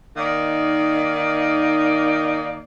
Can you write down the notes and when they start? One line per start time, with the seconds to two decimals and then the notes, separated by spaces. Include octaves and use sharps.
0.17 D#3 A#3 D#4 D5